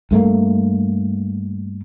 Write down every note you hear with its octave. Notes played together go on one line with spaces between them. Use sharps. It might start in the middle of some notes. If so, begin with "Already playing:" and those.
G2 A3 A#3